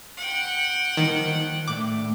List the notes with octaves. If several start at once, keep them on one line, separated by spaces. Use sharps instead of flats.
F#5 G5
D#3 F3 G3 A#3
A2 A3 D4 D6